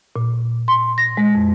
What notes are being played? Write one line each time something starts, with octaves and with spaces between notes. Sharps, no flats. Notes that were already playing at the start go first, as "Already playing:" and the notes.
A#2
C6
A#6
G#3
F2